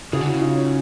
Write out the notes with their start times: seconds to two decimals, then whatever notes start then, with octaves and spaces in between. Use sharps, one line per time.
0.13 C#3 F#4 G#4
0.21 D3
0.27 C#3 E4 F#4
0.40 D#4 F4
0.54 C#4 D#4